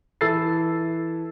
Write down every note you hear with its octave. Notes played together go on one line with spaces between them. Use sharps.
E3 A4 E6 A6 C7